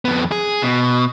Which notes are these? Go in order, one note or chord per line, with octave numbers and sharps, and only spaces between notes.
F2 B3
G#4
B2